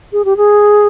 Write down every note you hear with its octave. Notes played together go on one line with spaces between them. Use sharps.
G#4
G4
G#4